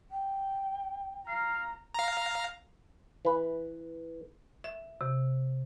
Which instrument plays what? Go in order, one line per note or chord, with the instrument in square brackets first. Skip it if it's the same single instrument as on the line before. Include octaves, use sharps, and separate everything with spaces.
[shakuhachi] G5
[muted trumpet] F5 [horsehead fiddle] A#5
[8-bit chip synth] F5 A#5
[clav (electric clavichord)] E3 B4
[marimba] E5
C3